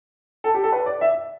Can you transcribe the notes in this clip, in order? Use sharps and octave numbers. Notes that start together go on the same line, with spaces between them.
A4
G4
A4
B4
D5
E5